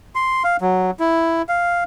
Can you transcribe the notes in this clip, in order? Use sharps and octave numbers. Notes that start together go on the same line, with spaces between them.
C6
F5
F#3
E4
F5